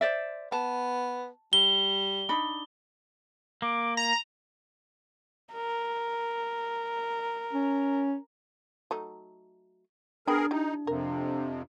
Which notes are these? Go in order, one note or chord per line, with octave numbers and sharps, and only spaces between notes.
C5 D5 E5
B3 A5
G3 G7
D4 D#4 B5
A#3 D6
A#5 F7
A#4
C#4
F#3 A3 D#4
B3 D4 G#4 A#4 G5 B5
D#4 E4 G4
F2 C3 A#4